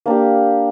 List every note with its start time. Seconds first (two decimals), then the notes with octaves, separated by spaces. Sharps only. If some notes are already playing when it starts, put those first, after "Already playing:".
0.06 A#3 D4 G4